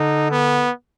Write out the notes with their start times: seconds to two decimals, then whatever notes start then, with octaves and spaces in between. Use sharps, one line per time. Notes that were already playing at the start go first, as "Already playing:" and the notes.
Already playing: D3 D#4
0.31 B3